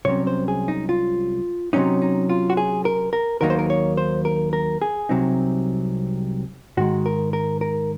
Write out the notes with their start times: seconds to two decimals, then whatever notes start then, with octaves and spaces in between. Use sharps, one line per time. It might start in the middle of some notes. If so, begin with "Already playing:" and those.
0.05 C2 C3 F#3 C#4 C#5
0.27 C5
0.48 G#4
0.68 D#4
0.89 F4
1.73 C3 F#3 C#4 D#4
2.02 D#4
2.29 F4
2.50 F#4
2.57 G#4
2.85 A#4
3.13 A#4
3.41 D#2 D#3 F#3 A#3 D#4 A#4
3.50 C5
3.59 A#4
3.70 C#5
3.97 C5
4.25 A#4
4.53 A#4
4.82 G#4
5.09 C2 C3 F#3 C4 D#4
6.77 G#2 D#3 G#3 F#4
7.06 A#4
7.33 A#4
7.61 A#4